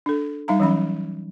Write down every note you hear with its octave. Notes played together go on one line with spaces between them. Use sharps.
D4 A4
G3 D#4 F5 A#5
E3 F#3 C#4 B5